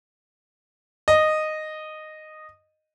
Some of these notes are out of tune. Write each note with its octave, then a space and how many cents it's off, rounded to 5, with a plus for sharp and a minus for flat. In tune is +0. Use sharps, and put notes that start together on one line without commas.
D#5 -10